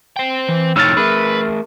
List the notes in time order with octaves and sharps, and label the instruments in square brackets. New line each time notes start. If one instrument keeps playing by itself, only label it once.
[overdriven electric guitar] C5 G5
[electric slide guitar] E3
[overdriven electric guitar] F2 C3 [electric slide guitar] A2 D#4 C#5 [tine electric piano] E6 F6 A6
[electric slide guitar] A3 G#4 A#4 [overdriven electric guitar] B4